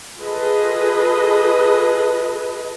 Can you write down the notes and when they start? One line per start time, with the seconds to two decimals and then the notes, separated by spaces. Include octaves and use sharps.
0.19 F4 G#4 A4 B4 D#5